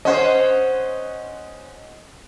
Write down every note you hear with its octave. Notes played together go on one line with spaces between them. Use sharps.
C#4 C5 D#5 F#5